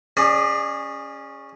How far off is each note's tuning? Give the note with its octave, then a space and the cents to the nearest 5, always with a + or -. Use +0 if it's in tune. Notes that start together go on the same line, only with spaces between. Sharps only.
C#4 +0 G#4 -15 D5 +35